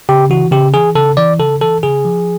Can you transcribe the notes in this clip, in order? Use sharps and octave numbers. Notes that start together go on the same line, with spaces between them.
C#3 G4
E3 F#4
C#3 G4
E3 G#4
C#3 A4
E3 D5
C#3 A4
E3 A4
C#3 G#4
F3